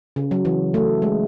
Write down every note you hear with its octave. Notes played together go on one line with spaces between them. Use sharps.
C#3
F#3
E3
A3
G#3